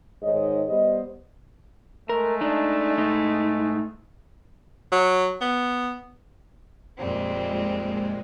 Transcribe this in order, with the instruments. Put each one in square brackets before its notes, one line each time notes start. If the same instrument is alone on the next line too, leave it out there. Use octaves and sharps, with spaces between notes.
[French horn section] G#2 D#3 C#5 D#5
G3 B3 C5 D#5
[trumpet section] G#3 A3 [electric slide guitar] A#4
[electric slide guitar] D4 D#4
A2 D#4
[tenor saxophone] F#3
B3
[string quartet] F2 G3 C4 [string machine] A#2 G#3